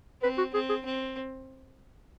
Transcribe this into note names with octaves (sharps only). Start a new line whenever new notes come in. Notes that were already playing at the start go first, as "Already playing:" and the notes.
C4 B4
F#4
C4 G#4
G#4
C4